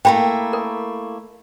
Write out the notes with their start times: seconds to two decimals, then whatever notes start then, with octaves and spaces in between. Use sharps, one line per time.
0.05 A3 A#3 E4 G5 B5
0.53 A#4